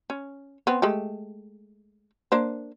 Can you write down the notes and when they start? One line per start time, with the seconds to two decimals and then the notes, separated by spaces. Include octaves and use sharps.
0.10 C#4
0.67 B3 C4
0.82 G#3 A3 G4
2.32 A#3 D4 C5